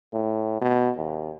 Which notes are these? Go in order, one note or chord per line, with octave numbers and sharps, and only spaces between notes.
A2
B2
D#2